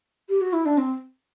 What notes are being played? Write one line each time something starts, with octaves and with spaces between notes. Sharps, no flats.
G4
F#4
E4
D4
C4